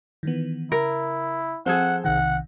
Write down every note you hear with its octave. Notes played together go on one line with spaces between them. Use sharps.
D#3 E3 B3
C#3 E4 A#4
F3 C4 G#4 A4 C5 F#5
B1 C3 D#3 F#5